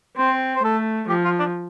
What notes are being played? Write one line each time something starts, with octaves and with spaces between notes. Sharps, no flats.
C4 C5
C5
A3 A4
F3 G4
F4
D4